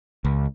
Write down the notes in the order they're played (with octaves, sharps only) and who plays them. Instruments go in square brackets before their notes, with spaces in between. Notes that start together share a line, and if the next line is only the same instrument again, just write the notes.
[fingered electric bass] C#2